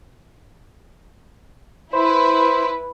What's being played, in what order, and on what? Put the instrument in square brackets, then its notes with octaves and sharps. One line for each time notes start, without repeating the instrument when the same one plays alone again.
[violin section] E4 B4 [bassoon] C5